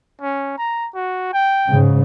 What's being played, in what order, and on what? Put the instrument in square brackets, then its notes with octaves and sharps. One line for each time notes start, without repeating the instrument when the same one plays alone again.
[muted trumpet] C#4
A#5
F#4
G5
[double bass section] G#2 C#3